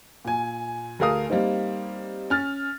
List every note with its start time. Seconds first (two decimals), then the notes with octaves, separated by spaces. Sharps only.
0.25 A#2 G#5
0.99 D2 A3 G#4 A#4 F5 D#6
1.30 G3 A#3 C4 D#4
2.30 C#4 F6 A6